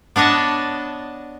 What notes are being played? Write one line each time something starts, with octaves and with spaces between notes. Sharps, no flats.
B3 D4 C#5 D#5 A5